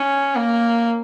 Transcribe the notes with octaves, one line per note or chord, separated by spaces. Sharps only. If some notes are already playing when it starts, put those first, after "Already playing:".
Already playing: C#4
A#3